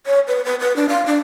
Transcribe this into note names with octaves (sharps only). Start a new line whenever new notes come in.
C#5
B4
B4
B4
D4
F5
D4